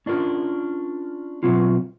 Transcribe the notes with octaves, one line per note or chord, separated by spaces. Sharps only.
C#4 D4 F4 A#4
B2 F#3 C4 F4